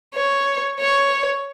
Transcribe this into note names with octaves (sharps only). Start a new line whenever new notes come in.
C#5
C#5